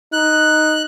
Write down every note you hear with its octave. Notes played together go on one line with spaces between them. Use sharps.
D#4 F#6